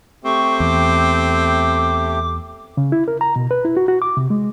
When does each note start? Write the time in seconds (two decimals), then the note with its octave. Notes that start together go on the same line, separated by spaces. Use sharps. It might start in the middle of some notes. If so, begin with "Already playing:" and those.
0.24 A3 C4 G4 C#6
0.60 E2 D6
2.77 C#3
2.92 E4
3.08 A#4
3.21 A#5
3.36 B2
3.51 B4
3.65 E4
3.77 F#4
3.88 F#4
4.02 D6
4.17 C3
4.30 G#3